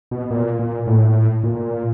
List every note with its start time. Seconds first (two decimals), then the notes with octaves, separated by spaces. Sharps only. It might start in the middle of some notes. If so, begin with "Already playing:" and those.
0.11 B2
0.31 A#2
0.59 A#2
0.87 A2
1.44 A#2